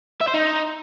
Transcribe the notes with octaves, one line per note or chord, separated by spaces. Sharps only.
E5
C5
D#4